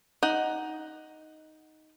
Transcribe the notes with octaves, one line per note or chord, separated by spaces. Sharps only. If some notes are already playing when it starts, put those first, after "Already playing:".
D#4 F#5